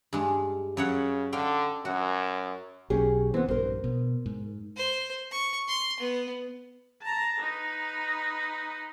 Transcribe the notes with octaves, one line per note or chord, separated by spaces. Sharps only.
G2 G#3
F#2 C#3 C#5 F#5
D3 F5 G5
F#2 F#4
B1 C#4 G4 G#4
E3 B3 C4
A#1 G2 A#4 C5
B2
G#2
C5
C#6
C6
B3
A5 A#5
D#4 B4